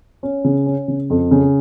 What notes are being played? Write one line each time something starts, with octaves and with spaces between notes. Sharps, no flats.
C#4
C#3
C#4
C#3
F2
C#3